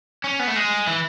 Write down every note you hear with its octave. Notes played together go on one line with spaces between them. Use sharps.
C#4
B3
A3
G#3
E3